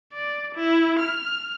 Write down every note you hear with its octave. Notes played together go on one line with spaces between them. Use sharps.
D5
E4
F6